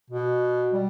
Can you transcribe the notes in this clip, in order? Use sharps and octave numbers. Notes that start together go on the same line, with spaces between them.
B2
G3